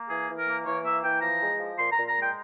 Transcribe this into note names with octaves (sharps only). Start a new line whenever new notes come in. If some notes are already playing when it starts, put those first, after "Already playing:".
Already playing: A#3
E3 G#4
E3
A#4
A#3
E3 C#5
A#3 E5
E3 G5
F3 A#5
G#3
F3
A#2 C6
A#5
A#2
A#5
G#3
G5